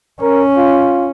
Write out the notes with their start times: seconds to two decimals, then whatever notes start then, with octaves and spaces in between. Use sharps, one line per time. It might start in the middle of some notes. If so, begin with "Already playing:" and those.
0.21 C#4 A#4
0.57 F4